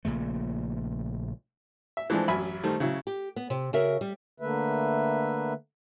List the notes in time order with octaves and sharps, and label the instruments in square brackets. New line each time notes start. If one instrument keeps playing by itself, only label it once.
[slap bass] A#1 A#2 C#3 A3
[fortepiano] E5
E3 F3 G#3 A3 C4 D4
A1 F#2 E5 G#5 B5
D#3 G3 A3 C5
C#3 F#3 E4
[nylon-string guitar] G4
B3
C3
C#3 F#4 A#4 E5
G3
[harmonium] D3 A3 A#3 B4 E5